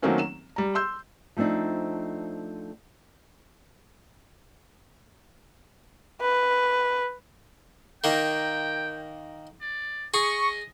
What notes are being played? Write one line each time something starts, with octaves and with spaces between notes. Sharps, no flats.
D#3 F#3 A3 A#3 C4 C#4
E7
G3 A#5
C6 E6 G6
F3 A3 C4 D4 D#4
B4
D#3 A#3 G5
D5
G#4 D#5 C#6